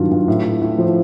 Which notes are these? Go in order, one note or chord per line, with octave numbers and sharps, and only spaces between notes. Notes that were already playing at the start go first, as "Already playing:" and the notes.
Already playing: G2 D#3 F#3 F4
G2
A2
A2
A2
F3